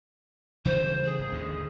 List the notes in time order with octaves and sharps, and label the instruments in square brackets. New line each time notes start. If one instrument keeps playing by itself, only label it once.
[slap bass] C#3 E3 G3 [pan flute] C5
[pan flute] G#4
[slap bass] G#1
D#2 G#2 D3